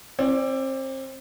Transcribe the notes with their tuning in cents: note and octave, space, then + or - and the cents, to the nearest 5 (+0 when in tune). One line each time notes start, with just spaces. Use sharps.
C4 +30 D5 +0